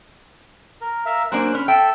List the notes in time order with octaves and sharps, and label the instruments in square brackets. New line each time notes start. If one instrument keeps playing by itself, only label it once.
[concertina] A#4
A#4 E5 F5
[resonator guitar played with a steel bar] F#3 A#3 D4 [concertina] C#4 C5 F#6
[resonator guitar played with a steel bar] C#4 [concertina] B5 F6
[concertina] A4 E5 [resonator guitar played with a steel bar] G5